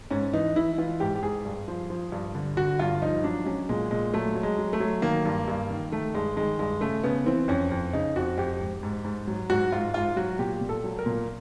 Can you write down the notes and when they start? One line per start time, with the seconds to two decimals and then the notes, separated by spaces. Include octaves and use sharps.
0.11 G#2 C#4
0.33 E3 D#4
0.56 E3 E4
0.78 E3 F4
1.00 G#2 G4
1.16 G4
1.22 G#2 G#4
1.45 G2
1.68 F3
1.90 F3
2.12 G2
2.35 D3
2.57 D3 F#4
2.79 G2 F4
3.02 F3 D#4
3.24 F#3 D4
3.46 F#3 C#4
3.69 A#2 G#3
3.91 A#2 G#3
4.14 F#3 A3
4.35 F#3
4.43 G#3
4.59 F#3
4.73 A3
4.80 F#3
5.02 D#3 A#3
5.26 G2
5.48 G2
5.70 D#3
5.92 D#3 A3
6.14 G2 G#3
6.37 D#3 G#3
6.59 G2 G#3
6.81 C#3 A3
7.04 C#3 B3
7.26 E3 C4
7.48 F2 C#4
7.72 F2
7.93 C#3 D#4
8.16 F2 F#4
8.38 F2 G4
8.60 G#2
8.83 G#2
9.04 G#2
9.27 F#3
9.50 G#2 F#4
9.72 G#2 F4
9.94 G#2 F4
10.16 F#3 F#4
10.39 A#2 G4
10.61 A#2
10.69 A4
10.84 F#3
10.99 A#4
11.06 A#2